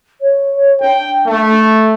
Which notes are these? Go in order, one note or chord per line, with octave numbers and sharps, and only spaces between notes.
C#5
D4 G5
A3